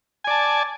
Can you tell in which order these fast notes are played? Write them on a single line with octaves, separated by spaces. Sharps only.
G#5 D5 A5